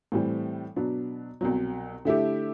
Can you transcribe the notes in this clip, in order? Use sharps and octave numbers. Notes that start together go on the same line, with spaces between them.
A2 E3 G3 C4
B2 F#3 B3 D4
C2 B2 F#3
D3 A3 E4 G4